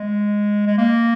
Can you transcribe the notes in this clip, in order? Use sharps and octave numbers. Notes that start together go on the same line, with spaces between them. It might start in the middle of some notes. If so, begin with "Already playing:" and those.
Already playing: G#3
G#3
A#3